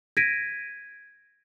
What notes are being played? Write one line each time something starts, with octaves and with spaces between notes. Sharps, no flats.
G#6 A#6 B6 D7 D#7